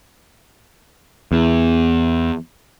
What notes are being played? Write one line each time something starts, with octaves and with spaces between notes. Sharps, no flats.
E2